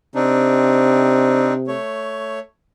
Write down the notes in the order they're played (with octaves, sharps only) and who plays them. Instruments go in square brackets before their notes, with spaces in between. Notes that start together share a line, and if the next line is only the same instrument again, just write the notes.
[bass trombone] C3 [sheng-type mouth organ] C4 D4 D#4
[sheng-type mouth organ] A3 C#5